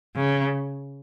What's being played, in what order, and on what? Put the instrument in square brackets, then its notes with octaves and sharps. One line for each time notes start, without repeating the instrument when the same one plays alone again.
[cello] C#3